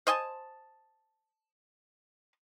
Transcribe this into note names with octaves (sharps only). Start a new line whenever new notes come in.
C5 D#5 G#5 A5